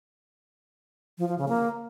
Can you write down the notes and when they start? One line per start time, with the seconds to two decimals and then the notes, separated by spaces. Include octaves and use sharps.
1.18 F3
1.28 F3
1.38 C#3
1.48 A#3